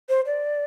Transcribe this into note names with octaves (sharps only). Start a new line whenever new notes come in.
C5
D5